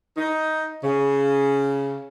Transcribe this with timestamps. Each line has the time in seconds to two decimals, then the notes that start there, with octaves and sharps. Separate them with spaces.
0.17 D#4
0.83 C#3